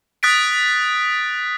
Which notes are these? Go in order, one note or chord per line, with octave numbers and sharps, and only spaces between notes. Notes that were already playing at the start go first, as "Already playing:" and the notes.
D#6 F#6 A6 B6 D7